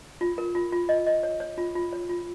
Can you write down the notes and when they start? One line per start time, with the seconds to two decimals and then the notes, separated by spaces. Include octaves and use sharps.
0.21 F4
0.38 A#4
0.55 F4
0.72 F4
0.89 D#5
1.07 D#5
1.23 C#5
1.40 C#5
1.58 F4
1.75 F4
1.93 C#5
2.09 F4